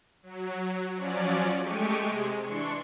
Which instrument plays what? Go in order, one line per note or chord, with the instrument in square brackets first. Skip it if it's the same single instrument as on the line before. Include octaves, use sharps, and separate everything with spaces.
[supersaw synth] F#3
F3 F#3 C#4 D5
G#3 A3 G4 C#6 D7 D#7
C3 G#3
E3 D4 C6 C#6 C#7